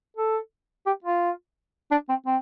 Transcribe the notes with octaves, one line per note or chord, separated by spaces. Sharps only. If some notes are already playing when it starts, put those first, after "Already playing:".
A4
G4
F4
D4
C4
C4